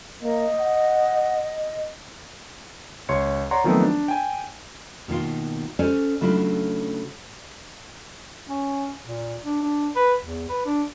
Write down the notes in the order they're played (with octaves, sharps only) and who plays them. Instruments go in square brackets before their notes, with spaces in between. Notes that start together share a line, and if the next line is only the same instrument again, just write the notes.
[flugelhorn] A#3 [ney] D#5
[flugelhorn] F#5
[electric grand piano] C#2 C#5 C6 C#7
C#5 D5 F#5 A#5 C6 C#6
D#3 F3 F#3 A3 B3 C4
D4
G5 G#5
[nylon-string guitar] B2 D#3 A#3 F4
C#4 A4 C5 D5 G#5
C#3 F#3 A3 D4 E4 F4
[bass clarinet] C#4
A#2
D4
D4
B4
E2
B4
D4